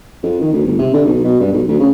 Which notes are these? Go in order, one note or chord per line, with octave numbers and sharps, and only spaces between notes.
F2
D#3
D2
G1
C3
D3
B1
B2
G2
B1
D2
C#3